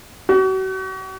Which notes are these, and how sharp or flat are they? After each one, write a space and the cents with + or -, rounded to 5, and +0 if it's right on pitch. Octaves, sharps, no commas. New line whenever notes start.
F#4 +40